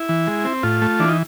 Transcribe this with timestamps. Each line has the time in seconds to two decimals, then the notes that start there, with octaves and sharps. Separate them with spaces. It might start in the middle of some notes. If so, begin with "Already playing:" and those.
Already playing: E4
0.09 E3
0.27 G#3
0.45 C4
0.63 A2 F4
0.82 A3
1.00 E3 D4
1.09 D#4